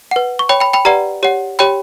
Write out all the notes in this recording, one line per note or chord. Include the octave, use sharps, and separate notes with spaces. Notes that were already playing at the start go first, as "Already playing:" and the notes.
B4 F#5
C#6
C#5 G5 B5
G5 B5
G5 B5
G4 B4 D5 F#5 A#5
G4 C#5 F#5
G4 C#5 G5 B5